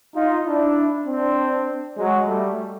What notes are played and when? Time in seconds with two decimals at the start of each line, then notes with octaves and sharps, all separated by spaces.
0.15 D#4 F4
0.46 D4 E4
1.06 C4 D4
1.97 F#3 G#3
2.27 G3 A3